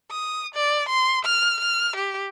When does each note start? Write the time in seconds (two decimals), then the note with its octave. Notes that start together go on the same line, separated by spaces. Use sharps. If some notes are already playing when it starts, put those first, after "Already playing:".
0.11 D#6
0.55 D5
0.89 C6
1.25 F6
1.60 F6
1.96 G4